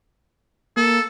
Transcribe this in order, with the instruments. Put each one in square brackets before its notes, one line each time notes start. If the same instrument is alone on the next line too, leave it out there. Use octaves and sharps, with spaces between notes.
[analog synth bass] A#3 [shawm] A4